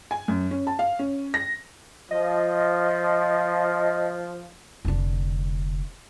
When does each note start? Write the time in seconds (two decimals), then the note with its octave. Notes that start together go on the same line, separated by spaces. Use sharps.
0.11 G#5
0.28 F#2
0.51 C#4
0.67 A5
0.79 F5
0.99 C#4
1.34 A#6
2.11 F3 D#5
4.85 F1 D3